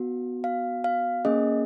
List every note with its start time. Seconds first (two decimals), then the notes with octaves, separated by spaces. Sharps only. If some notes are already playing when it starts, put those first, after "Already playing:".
Already playing: B3 F#4
0.44 F5
0.84 F5
1.25 A#3 C#4 G#4 D#5